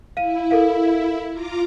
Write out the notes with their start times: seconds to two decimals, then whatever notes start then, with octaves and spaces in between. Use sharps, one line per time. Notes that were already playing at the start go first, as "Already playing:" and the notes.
0.17 E4 F5 D#7
0.51 A4 A#4 F5
1.31 F4 A#5 D6